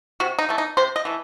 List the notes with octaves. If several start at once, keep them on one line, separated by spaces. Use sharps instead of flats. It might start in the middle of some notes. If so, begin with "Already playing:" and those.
C3 F#4
D#4
E3 A3
D#4
C3 C5
D#5
E3 A3